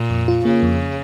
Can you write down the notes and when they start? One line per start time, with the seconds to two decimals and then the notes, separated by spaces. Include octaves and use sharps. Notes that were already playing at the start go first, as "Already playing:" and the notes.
Already playing: A#2
0.10 F2
0.28 F4
0.45 C#3 A#3
0.63 F2